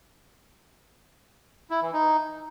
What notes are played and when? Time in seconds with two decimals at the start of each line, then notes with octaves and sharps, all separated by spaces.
1.70 E4
1.82 E3
1.93 D#4